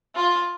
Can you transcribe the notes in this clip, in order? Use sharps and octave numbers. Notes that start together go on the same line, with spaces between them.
F4